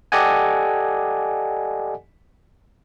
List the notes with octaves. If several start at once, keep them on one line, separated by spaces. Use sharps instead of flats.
G4 A4 D5 D#5 F#5 G#5